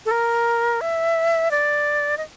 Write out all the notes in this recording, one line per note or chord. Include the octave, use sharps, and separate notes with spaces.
A4
A#4
E5
D5
D#5